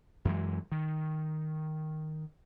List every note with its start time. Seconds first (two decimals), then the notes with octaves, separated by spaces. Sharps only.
0.25 F#2 E3 G#3
0.72 D#3